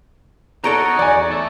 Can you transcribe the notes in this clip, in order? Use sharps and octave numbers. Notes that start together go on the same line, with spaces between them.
D#4 F#4 A4 C#5 D5 A#5
E2 D5 G#5
A4 E5